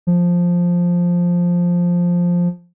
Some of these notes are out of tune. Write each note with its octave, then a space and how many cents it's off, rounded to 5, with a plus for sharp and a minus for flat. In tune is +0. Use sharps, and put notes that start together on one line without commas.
F3 +5